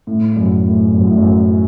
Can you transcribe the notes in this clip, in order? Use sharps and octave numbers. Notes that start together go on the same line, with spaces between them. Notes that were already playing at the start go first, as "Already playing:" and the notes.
A2
F#2
A2
F#2
A2
F#2